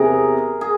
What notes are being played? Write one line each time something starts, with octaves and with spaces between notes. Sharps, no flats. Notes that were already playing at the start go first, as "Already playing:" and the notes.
Already playing: E2 C3 G#4 A#4
G#4